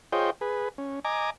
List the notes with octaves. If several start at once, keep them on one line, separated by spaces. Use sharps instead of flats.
F4 G#4 C5 C#5 D#5 G5
G#4 B4
C#4
D#5 G#5 A#5 D6